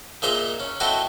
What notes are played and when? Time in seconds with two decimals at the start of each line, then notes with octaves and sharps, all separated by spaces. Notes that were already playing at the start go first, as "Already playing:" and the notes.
0.22 A#2 D#4 G#4 C5 E5 G#5
0.60 C#4
0.80 A3 C4 E4 F#4 D#5 G5